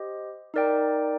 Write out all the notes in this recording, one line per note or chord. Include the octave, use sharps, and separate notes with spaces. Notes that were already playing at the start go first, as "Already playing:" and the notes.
Already playing: G4 C5 D#5
D#4 A#4 D5 G5